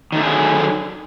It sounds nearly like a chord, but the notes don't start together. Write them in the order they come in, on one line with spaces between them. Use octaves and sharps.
D#3 A3 D3 G#4 F#3